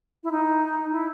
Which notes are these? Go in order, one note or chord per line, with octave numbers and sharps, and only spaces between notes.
E4
D#4
E4